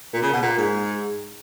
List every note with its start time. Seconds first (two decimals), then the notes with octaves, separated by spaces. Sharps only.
0.13 A#2
0.22 C#3
0.33 B2
0.42 A#2
0.58 G#2